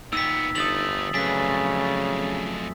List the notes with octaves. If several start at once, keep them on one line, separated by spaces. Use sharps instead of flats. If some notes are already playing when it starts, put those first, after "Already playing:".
A#2 B3 D#4 G5 E6 B6
G1 D3 A3 D#6 A6 F#7
F2 C#3 F#3 A3 D4 B4 G#5 B6